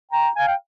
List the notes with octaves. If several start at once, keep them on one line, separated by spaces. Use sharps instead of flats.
G5 A#5
F5 G#5
G5